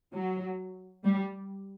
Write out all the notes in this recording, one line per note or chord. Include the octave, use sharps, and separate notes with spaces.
F#3
G3